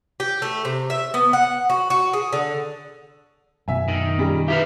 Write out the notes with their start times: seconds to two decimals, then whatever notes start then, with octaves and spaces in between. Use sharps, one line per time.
0.20 G4
0.42 A3
0.65 C3
0.90 E5
1.14 B3
1.33 F#5
1.70 F#4
1.90 F#4
2.13 G#4
2.33 D3
3.68 F#2 B2 E5 G#5
3.88 D#3
4.18 A#2 C#3 G3
4.48 E4 G4 B4 E5 F5